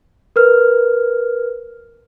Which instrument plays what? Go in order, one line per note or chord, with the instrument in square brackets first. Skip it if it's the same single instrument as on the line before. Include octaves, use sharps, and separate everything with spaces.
[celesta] A#4 B4 F6